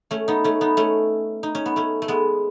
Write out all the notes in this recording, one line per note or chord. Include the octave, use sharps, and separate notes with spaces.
A3 C#4
B3 D#4
A3 C#4
B3 D#4
A3 C#4
D#4
C#4
B3
A3 C#4
A3
G#3 B3